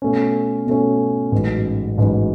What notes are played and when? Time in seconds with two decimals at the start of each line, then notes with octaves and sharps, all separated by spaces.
0.02 B2 A3 C#4
0.66 B2 A3 C#4
1.32 A1 G#2 F#3
1.98 A1 G#2 F#3